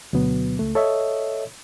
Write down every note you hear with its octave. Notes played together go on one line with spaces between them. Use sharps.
D2 B2 F#3 B3
C#2 A3
A4 C#5 D#5 E5